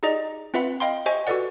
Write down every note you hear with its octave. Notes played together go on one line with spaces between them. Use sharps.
D#4 G4 G#4 D5 D#5 A#5
C4 F4 B4 E5 F#5 B5
D#5 F5 G5 B5 C6
G4 C5 D#5 E5 G#5 C#6
F#4 G4 A4 B4 D5 F#5